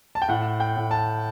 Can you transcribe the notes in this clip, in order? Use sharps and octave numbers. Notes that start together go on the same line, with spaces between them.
A5
G5
A2 F#5
G5
A2
A5